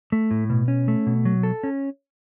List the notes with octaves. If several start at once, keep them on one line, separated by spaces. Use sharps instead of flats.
A3
A2
B2
C#4
A3
B2
F#3
A4
C#4